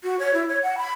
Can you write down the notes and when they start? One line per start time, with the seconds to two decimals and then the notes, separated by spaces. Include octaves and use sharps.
0.04 F#4
0.19 C#5
0.34 E4
0.49 C#5
0.63 F#5
0.78 B5